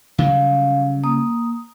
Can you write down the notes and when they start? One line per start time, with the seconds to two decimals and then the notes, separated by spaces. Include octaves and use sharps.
0.18 C#3 F#3 G3 F5
1.04 A#3 D#6